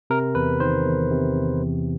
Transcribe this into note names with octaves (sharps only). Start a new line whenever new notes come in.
C3 A#4
E2 B4
D#3 C5
E2
C3
E2
E3